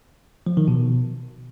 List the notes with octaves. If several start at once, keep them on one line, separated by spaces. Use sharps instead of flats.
F3
D#3
B2